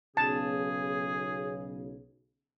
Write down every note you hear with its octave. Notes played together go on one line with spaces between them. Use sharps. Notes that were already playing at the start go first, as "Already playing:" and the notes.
B1 C#3 G#4 A5